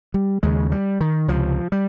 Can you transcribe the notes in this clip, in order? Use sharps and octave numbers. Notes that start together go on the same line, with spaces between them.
G3
D#2 C#3 G#3
G3
D#3
C#2 C3 F3
G3